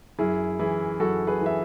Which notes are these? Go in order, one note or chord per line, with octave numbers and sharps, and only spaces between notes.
F#2 E4 G#4
E3 E4 G#4
F#2 F#4 A4
G#4 B4
E3 E5